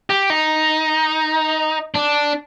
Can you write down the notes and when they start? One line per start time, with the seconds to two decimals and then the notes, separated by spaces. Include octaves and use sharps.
0.10 G4
0.30 D#4
1.94 D4